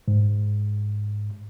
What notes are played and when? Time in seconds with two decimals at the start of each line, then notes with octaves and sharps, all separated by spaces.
0.08 G#2